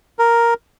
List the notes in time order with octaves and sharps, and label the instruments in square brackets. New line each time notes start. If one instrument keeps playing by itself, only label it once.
[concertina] A#4